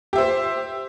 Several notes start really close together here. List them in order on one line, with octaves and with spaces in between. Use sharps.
G4 E5 C5